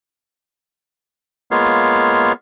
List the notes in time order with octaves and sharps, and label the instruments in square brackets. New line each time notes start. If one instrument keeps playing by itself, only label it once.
[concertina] G#3 A#3 B3 F4 C#5 F5